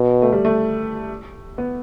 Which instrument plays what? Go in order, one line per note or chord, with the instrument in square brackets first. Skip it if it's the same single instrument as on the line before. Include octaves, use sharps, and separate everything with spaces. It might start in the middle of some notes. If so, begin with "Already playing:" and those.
Already playing: [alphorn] B2
[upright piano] A3
G3
A3
B3